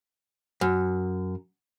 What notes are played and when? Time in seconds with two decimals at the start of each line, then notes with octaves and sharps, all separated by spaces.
0.61 F#2